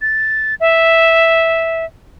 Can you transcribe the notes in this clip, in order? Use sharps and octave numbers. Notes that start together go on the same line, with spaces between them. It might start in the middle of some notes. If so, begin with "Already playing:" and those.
A6
E5